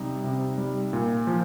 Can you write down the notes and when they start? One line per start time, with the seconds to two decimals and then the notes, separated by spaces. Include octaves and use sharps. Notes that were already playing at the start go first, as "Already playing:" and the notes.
Already playing: C3 G3 D#4
0.24 C3
0.58 G3
0.93 A#2
1.27 F3